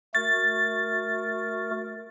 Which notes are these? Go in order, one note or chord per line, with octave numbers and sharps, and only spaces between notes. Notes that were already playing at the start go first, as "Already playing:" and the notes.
A3 F#4 A#4 A6